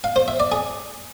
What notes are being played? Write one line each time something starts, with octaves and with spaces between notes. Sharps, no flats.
F5
C5
E5
D5
G#4